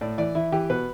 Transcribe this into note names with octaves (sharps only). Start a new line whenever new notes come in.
A2 D5
E3 D5
E3 E4
E3 G4
B2 B4